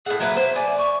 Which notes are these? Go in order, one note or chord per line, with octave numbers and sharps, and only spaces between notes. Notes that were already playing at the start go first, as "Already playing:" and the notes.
A2 G#4 F#5
F#3 A#3 B4 E5
C5
D5 G#5
C#6